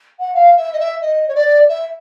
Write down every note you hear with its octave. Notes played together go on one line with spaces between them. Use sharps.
F#5
F5
E5
D#5
E5
D#5
C#5
D5
E5